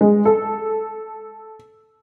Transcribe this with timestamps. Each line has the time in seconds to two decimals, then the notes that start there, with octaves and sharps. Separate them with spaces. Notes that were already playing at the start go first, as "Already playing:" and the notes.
0.01 G#3
0.25 A4